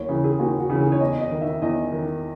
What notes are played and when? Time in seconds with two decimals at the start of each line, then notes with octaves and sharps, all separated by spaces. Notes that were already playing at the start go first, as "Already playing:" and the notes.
Already playing: D#2 C#5
0.09 C#3 E3
0.24 G#4
0.39 D#2 F#4
0.60 F#4
0.70 C#3 E3
0.80 G#4
0.92 C#5
1.00 E2 D#5
1.21 D#5
1.31 D#3
1.41 E5
1.62 E2 D#5
1.92 D#3